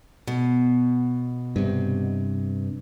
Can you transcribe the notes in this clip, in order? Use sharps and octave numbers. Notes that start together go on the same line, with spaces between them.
B2
G2 C3